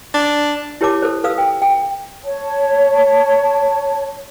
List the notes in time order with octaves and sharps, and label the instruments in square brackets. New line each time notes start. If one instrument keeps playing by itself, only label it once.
[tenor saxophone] D4
[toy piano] E4 G4 A#4 C#5 A5 D6
A4 A#4 C5
A4 B4 F5 D#6 E6
G5
G5
[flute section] C#5 A5